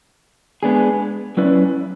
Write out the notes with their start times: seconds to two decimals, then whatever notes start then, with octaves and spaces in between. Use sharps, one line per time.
0.63 G#3 B3 D4 G#4
1.37 F#3 C#4 E4 B4 D5